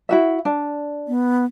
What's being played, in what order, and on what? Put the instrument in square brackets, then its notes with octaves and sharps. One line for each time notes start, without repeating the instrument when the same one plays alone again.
[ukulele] E4 F#4 E5
D4
[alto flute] B3